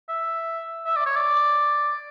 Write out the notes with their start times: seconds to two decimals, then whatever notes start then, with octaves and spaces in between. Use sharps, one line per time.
0.09 E5
0.86 E5
0.96 D5
1.06 C#5
1.16 D5